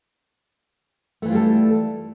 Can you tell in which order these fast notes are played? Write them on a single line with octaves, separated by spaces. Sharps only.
A3 E3 F4 G3 A4